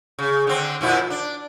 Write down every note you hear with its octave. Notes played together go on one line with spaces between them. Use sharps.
C#3
D3 C4
F2 A#2 E4
D4